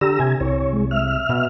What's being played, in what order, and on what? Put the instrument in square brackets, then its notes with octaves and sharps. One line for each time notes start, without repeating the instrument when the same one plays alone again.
[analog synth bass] D3 [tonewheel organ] G4 A#5 E6
[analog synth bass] C3 [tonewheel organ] G#5
[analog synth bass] C2 [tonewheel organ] C#5
[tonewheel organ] G#3
E5 F6
[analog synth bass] B2